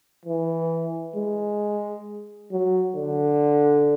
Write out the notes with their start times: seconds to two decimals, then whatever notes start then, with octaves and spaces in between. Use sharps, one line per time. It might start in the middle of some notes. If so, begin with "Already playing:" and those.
0.26 E3
1.16 G#3
2.52 F#3
2.96 D3